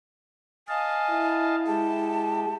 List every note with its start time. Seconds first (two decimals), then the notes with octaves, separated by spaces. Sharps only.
0.68 D#5 F5 G#5 A5
1.10 E4
1.67 G#3 G4 A5